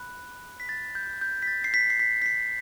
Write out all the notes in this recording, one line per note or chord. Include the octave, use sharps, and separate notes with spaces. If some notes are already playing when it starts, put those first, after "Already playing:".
Already playing: B5 F#6
B6
A6
G6
G6
B6
A6
C7
B6
C7
B6
B6
C7